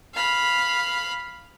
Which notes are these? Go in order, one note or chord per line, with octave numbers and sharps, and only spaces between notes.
F5 B5